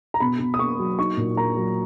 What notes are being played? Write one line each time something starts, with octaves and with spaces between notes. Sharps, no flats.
A#5
B2 B5
B2
D#6
A#3 C#6
F#3
D#4 C#6
A#2
A#3 A#5
F#3